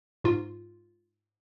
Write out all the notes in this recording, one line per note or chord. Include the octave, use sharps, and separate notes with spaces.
G#2 F4